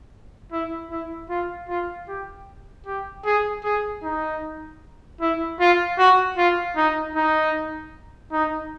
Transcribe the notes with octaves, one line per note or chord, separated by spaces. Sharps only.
E4
E4
F4
F4
G4
G4
G#4
G#4
D#4
E4
F4
F#4
F4
D#4
D#4
D#4